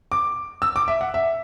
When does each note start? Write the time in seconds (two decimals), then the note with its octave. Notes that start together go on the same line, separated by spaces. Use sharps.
0.12 D6
0.62 E6
0.76 D6
0.88 E5
1.01 F#5
1.14 E5